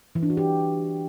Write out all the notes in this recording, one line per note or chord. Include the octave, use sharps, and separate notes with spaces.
E3
D4
F#4
G4